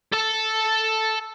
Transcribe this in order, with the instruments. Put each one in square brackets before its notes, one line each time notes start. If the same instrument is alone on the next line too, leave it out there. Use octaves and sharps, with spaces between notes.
[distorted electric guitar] A4 A5